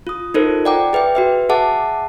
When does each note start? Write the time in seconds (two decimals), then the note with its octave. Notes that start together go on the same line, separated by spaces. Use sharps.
0.07 F4 D#6
0.34 D#4 F4 A4 A#4 C5
0.65 D5 F#5 G5 A#5 D6
0.93 G#4 B4 E5 G5
1.15 F#4 B4 E5
1.49 G#4 E5 F#5 A5 D6